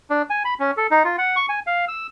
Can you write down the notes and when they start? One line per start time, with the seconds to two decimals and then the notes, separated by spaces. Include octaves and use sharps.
0.10 D4
0.30 G#5
0.45 B5
0.60 C#4
0.77 A4
0.91 D#4
1.04 F4
1.18 F#5
1.36 C#6
1.49 G#5
1.67 F5
1.88 E6